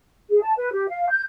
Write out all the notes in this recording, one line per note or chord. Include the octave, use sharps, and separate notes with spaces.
G#4
A5
B4
G4
F5
G6